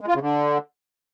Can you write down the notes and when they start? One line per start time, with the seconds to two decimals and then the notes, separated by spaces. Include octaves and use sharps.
0.01 G#3
0.08 F4
0.15 C#3
0.22 D3